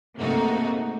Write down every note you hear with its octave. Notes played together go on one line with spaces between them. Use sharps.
G#2 C3 A3 A#3 D#4 F#4